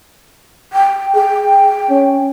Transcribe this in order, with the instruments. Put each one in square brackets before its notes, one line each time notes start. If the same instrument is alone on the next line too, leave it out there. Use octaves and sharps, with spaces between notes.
[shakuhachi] G5
[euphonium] G#4 [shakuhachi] G5
[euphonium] C#4